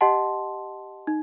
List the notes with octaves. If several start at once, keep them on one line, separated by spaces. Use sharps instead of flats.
G4 D#5 F#5 A5 C6
D#4